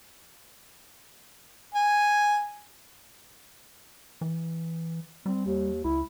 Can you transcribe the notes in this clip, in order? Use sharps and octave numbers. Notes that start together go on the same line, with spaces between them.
G#5
E3
G3 C4
D#2
C#2 E4